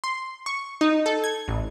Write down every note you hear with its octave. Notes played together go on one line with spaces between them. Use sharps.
C6
C#6
D#4
A4
G#6
A1